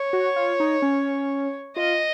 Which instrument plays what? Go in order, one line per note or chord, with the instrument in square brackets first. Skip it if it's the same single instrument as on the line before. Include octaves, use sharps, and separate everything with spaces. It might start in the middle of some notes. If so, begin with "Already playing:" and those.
Already playing: [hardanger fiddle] C#5
[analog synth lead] F#4
F4
D#4
C#4
[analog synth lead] F4 [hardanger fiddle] D#5